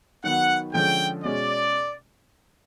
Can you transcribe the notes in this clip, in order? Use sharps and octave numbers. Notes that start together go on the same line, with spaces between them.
D#3 F#3 B3 F#5
D3 F3 G#3 C#4 G5
B2 G#3 C#4 D5